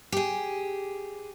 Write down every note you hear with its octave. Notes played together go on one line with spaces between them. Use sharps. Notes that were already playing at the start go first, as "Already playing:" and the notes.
G4 G#4